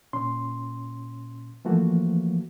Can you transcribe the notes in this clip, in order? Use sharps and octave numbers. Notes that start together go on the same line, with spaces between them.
A#2 C#4 C6
E3 F3 A3 A#3 F#4